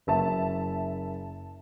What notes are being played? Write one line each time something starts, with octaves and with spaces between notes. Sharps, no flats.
F#1 E5 A5